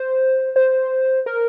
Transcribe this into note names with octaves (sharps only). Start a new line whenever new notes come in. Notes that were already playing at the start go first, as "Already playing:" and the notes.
Already playing: C5
C5
A#4